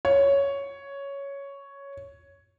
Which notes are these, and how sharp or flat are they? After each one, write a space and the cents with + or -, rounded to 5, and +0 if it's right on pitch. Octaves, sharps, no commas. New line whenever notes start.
C#5 +5